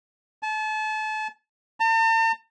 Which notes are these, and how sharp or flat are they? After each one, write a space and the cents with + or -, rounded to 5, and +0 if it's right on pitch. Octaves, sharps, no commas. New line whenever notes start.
A5 -35
A5 +45